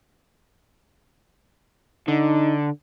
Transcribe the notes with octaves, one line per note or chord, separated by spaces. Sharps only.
D3 D#4